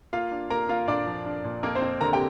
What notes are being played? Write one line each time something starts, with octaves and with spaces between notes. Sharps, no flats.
A#3 F4 F5
D4
A#3 A#4 A#5
A#3 F4 F5
A#2 D4 D5
F3
D4
A#2
F2 A#3 A#4
C4 C5
F2
D3 A#4 A#5
G4 G5